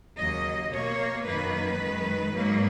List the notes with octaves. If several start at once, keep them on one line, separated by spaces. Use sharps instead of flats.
D#2 C#3 F#3 A#3 D#5
B2 A#3 C#5
F#2 D#3 A#3 B4
F#2 D#3 G#3
G#2 F#3 A#3